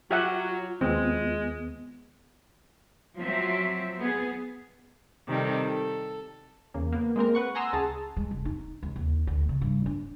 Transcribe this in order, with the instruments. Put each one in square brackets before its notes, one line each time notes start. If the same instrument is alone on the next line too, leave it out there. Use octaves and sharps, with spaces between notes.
[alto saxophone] F#3 [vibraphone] F4 [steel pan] G4 E5 F#5
[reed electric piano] D#2 B3 [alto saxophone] G#3 [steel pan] C4
[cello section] F3 F#3 C4 E5
B3 G#4
[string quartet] C3 D#3 G3 A4
A4
[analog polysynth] E2 C#3 A#3
A#3 B3
G#3 A#3 C4 A#4
B4 F#5 C#6
F#5 G#5 A#5 C6 D#6 E6
C#2 G#4 A5
[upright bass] G#3
F1
D#4
C#2
D#2
D2
C#3
G2
D4